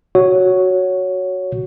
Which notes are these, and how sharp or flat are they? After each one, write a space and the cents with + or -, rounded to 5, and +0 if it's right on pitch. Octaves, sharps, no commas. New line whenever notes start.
F#4 +0 C#5 +5